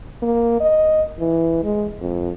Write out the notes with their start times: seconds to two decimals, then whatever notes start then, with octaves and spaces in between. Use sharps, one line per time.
0.22 A#3
0.60 D#5
1.20 E3
1.64 G#3
2.01 F2